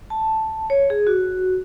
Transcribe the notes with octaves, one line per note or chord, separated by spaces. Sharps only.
A5
C#5
G#4
F#4